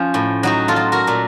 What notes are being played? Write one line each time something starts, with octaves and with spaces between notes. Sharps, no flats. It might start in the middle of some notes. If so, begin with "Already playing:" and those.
Already playing: F3 C#4 F4
A2
F#3 D#4 F#4
F4 A4
F#3
F#4 A#4
A#2